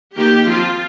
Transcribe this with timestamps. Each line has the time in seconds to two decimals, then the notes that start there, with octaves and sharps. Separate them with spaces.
0.16 D#3 A#3 G4
0.46 F3 C4 F4